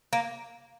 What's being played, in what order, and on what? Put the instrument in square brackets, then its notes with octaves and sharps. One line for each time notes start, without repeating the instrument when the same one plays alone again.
[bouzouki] A#3